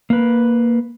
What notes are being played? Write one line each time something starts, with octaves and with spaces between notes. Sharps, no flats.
A#3 B4